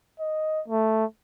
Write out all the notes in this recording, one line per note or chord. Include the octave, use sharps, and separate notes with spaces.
D#5
A3